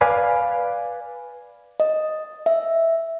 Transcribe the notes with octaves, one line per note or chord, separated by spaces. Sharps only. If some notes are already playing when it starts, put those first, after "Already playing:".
B4 D5 F5 G#5 B5
D#5
E5